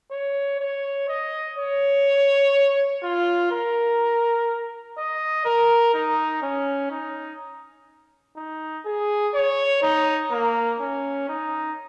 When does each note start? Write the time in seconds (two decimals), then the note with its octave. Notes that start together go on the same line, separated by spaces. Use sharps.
0.11 C#5
0.60 C#5
1.08 D#5
1.57 C#5
3.03 F4
3.51 A#4
4.97 D#5
5.45 A#4
5.94 D#4
6.42 C#4
6.91 D#4
8.36 D#4
8.86 G#4
9.34 C#5
9.82 D#4
10.31 A#3
10.80 C#4
11.28 D#4